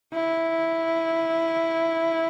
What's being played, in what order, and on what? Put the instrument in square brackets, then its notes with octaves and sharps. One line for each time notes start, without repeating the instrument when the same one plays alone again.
[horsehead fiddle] E4